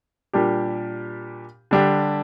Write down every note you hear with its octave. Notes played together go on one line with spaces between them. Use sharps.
A#2 G3 D4 G4
D3 G3 D4 G4